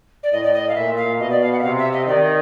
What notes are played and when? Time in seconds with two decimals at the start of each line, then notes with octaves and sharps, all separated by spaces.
0.23 D5
0.32 A2 D#5
0.44 D5
0.53 D#5
0.69 F5
0.75 A#2 E5
0.97 F5
1.19 B2 D#5
1.30 D5
1.41 F5
1.53 F#5
1.59 E5
1.62 C3 F5
1.78 E5
1.93 D#5
2.07 D#3 D5